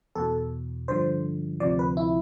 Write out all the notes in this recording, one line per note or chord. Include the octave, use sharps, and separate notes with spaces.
E2 B2 A4
G2 D3 F3 C5
D2 C3 F3 D5
B4
E4